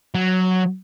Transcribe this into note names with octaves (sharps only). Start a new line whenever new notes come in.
F#3